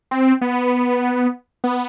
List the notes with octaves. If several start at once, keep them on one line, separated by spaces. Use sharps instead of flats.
C4
B3
B3